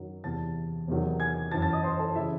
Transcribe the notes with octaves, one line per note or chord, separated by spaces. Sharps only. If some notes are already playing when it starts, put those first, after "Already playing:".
Already playing: F#2 D#3 F#3
E2 C3 E3 A5 A6
E2 C3 D#3 F#3
G#5 G#6
F#2 E3 A5 A6
A5 A6
D#5 D#6
C5 C6
A4 A5
C#3 E3 E4 E5